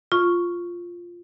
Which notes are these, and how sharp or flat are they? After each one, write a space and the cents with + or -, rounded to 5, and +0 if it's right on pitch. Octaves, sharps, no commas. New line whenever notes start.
F4 +0 C#6 +0